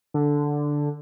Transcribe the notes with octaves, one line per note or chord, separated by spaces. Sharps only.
D3